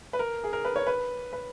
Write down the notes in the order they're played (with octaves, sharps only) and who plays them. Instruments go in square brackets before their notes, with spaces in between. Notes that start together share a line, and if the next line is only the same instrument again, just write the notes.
[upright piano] B4
A#4
G#4
A#4
B4
C#5
B4
B4